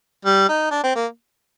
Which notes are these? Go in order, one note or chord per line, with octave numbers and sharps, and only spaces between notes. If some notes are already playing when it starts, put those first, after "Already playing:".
G3
D#4
D4
C4
A#3